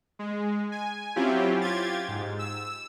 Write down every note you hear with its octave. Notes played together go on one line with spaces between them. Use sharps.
G#3
G#5
F#3 C4 C#4 E4 F4 G4
F4 G4 G#6 A6
G#2
E6